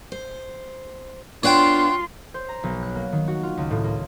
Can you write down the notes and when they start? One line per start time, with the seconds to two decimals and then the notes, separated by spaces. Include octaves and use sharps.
0.12 C5
1.43 B3 D4 F4 C#5 F#5 G5 C6
2.34 C5
2.49 A#5
2.64 B1
2.83 F#6
2.95 A#3
3.12 D#3
3.28 F#4
3.43 F4
3.57 C#2
3.71 A2
3.84 A#3